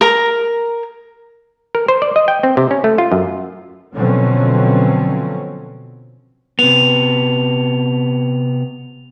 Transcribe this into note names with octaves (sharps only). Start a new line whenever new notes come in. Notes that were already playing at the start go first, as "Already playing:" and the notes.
A#4 A#5
A#4
C5
D5
D#5
G5
C4
C3
C#4
A3
F4
F#2
B2 D3 F3 F#3 C4 C#4
C3 B3 F7